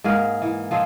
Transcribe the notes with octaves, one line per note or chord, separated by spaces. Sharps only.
G#2 A#3 G#4 A#4
E3
F3 C4 D#4 G#4